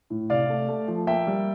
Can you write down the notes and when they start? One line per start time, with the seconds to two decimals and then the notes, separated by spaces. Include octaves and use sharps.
0.10 A2
0.30 C3 D5 F5
0.50 A3
0.68 A3
0.88 F3
1.07 A#3 E5 G5
1.27 G3